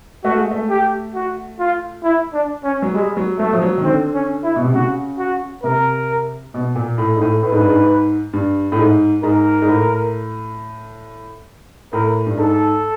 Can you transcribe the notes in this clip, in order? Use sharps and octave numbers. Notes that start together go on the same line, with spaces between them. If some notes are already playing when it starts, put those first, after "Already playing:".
A3 F#4
G#3
A3
G4
F#4
F4
E4
D4
C#4
F#3
G3 G#3
F#3
F#3 A3
F3
F#3
D#3
D3 C4
C#4
E4
B2
C3
C#3 F#4
F#4
C3 A#4
B2
A#2
A2
G#2
A2
A2 B4
G#2
G2
G#2
G2
A2
G#2
G#2 A#4
G#2
A2
A2 A#4
G2
G#2 A4